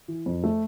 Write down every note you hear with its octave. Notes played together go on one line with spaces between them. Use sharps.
E3
F2
A3